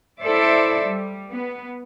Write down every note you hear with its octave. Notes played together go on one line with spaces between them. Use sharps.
E4 A4 C5 D5 E5
G3
B3